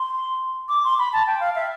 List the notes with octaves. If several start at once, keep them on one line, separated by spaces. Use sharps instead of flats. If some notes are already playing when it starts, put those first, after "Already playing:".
Already playing: C6
D6
C6
B5
A5
G5
F5
E5